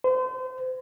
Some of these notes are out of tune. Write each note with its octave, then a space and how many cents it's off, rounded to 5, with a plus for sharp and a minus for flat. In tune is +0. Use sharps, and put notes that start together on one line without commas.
C5 -35